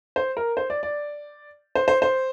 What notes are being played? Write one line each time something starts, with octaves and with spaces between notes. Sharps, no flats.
C5
A#4
C5
D5
D5
C5
C5
C5